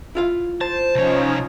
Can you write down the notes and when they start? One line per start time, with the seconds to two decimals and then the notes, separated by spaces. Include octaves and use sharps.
0.15 E4 F4 F5
0.61 C5 A5
0.95 C2 F3 C#4 D#4 C#5